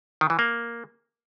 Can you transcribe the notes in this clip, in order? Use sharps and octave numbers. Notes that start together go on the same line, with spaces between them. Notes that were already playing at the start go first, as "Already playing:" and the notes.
D#3
E3
A#3